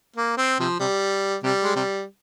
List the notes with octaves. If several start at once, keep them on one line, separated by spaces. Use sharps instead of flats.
A#3
C4
C3 F3
C3 G3
C3 G3
G#3
C3 G3